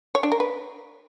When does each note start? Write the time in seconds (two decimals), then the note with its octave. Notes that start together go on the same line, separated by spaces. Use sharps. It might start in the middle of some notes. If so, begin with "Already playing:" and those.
0.15 C#5
0.23 D4
0.32 A#4
0.40 B4